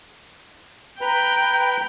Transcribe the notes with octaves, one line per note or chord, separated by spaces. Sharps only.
B4 G5 A#5 B5